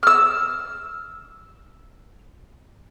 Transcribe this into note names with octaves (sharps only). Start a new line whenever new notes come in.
E6 F6